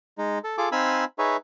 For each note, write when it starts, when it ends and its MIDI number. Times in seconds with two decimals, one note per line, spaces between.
0.18 0.39 56
0.18 0.39 63
0.44 0.57 69
0.58 0.69 65
0.58 0.69 68
0.58 0.69 69
0.58 0.69 86
0.72 1.05 60
0.72 1.05 63
0.72 1.05 77
0.72 1.05 80
0.72 1.05 83
0.72 1.05 88
1.19 1.37 63
1.19 1.37 68
1.19 1.37 71
1.19 1.37 73
1.19 1.37 76